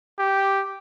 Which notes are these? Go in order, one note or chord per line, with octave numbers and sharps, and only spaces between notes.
G4